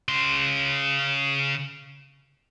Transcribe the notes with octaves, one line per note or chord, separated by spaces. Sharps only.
C#3 C6